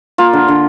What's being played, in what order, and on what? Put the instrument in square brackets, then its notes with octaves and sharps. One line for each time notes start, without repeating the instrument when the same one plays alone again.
[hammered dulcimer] A#3 F4
D3
D3